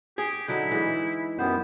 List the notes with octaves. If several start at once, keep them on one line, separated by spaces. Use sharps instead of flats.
G4 G#4
D3 F#3 D#4 E4
E3 G#3 D#4
F#2 B3 G4 C5